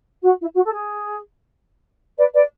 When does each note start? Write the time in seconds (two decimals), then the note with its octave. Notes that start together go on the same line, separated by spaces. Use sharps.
0.23 F#4
0.40 E4
0.55 F#4
0.64 A4
0.71 G#4
2.17 B4 D5
2.34 B4 D5